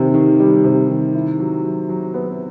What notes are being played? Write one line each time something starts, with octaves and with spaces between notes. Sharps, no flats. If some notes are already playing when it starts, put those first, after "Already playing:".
Already playing: C3 D#3
D#3
G3
C3
D#3
E4
F#3
F#3
F#3
B3